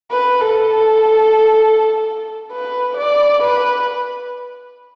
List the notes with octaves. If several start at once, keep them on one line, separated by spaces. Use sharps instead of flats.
B4
A4
B4
D5
B4